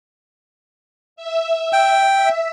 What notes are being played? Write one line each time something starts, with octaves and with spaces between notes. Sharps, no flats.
E5
G5
E5